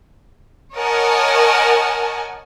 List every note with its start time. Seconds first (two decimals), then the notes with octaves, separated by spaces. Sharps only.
0.76 A#4 C#5 D#5 F#5 G#5 A5